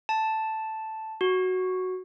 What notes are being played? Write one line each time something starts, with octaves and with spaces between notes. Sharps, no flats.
A5
F#4